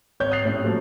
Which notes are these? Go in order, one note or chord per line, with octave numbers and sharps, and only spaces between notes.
G#1 C#5 G6
D#6 F#6 A6 C7 F7
A2 G3 C#4
F3 F#3 A3 A#3 C#4 F4